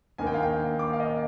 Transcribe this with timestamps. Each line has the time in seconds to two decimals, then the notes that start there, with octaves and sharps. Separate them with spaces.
0.18 D#2 D#3 A#3 G#5
0.27 G5
0.34 F5
0.42 G5
0.79 D6
0.93 F5
1.00 D#5